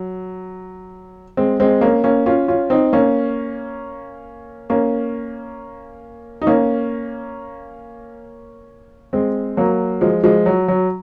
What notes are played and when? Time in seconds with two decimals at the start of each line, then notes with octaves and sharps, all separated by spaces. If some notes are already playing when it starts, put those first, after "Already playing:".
Already playing: F#3
1.37 G#3 C4
1.60 G#3 C4
1.81 A#3 C#4
2.04 A#3 C#4
2.26 C#4 F4
2.48 C#4 F4
2.70 C4 D#4
2.93 A#3 C#4
4.70 A#3 C#4
6.41 D#4
6.47 A#3 C#4
9.13 G#3 C4
9.57 F#3 A#3
10.01 F3 G#3
10.24 F3 G#3
10.46 F#3
10.68 F#3